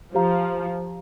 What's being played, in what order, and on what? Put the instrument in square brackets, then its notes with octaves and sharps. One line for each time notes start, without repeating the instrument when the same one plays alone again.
[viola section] F3 [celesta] G4 C5 F5 A#5